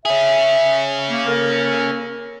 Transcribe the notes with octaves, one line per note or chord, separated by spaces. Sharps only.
C#4 G#4 E5
A#3
A#3 A4 A#4